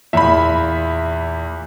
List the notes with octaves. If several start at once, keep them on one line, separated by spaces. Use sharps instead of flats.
E2 A#2 E5 B5